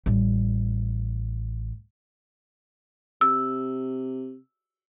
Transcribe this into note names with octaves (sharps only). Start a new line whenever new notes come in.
A1 G3
C3 E6